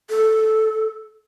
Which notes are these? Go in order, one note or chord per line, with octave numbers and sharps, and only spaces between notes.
A4